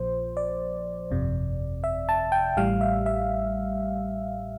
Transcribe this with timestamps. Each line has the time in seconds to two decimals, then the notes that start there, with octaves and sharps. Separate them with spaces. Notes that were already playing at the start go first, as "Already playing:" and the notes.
Already playing: A#1 A#2 F3 C5
0.37 D5
1.11 G1 F2 C3
1.84 E5
2.09 A5
2.32 G5
2.57 A1 A2 G3 F5
2.81 E5
3.06 E5